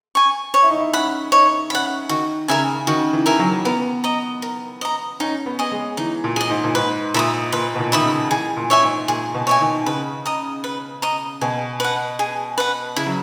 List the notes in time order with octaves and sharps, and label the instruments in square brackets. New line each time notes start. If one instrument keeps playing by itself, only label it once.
[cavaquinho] G#5 C#6
C#5
[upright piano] E4
D#4
E4
[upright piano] C#4 [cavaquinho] F#5 B5
[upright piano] D#4 [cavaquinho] C#5
[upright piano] C#4 [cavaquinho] F#5 B5
[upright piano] D#3 [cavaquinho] F#4
[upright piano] C#3 [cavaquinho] A#4 E5 G#5
[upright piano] D#3 [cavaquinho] F#4
[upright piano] E3
[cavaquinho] A#4 E5 G#5
[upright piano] F#3
[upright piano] B3 [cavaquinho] A#4
[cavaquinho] D#5 A#5
A#4
D#5 A#5
[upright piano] C#4 [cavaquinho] D#4
[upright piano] B3
[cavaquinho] G#4 D#5
[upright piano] G#3
[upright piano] E3 [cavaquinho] D#4
[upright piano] A#2
[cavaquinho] G#4 D#5
[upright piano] G#2
A#2
[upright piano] G#2 [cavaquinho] B4
[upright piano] A#2 [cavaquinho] E5 B5 D#6
[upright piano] A#2 [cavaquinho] B4
[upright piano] B2
A#2
[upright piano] D#3 [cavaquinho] E5 B5 D#6
[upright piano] C#3
[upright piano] E3 [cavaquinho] G#4
[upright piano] A#2
[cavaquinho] C#5 E5 G#5
[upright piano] G#2
[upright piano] A#2 [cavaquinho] G#4
[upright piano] B2
[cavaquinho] C#5 E5 G#5
[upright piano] D#3
[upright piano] C#3 [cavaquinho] B4
[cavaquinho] D#5 A#5 D#6
B4
D#5 A#5 D#6
[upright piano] B2 [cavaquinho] G#4
[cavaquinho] B4 F#5
G#4
B4 F#5
[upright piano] C#3 [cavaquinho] E4
[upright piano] F#3